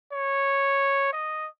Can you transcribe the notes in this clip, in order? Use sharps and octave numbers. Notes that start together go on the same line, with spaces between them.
C#5
D#5